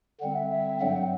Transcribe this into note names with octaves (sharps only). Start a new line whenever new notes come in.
D3 G3 C4 F#5
E5
E5
G2 F#3 C4 F#5
G5
F#5